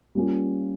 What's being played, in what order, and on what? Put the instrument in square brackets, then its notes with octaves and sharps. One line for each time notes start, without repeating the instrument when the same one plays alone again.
[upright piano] G3 A#3 C#4 F4